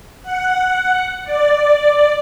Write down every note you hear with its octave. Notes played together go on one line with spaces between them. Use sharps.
F#5
D5